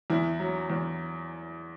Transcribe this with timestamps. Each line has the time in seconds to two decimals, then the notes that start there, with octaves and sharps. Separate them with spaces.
0.10 E2 E4
0.40 F#3
0.70 E2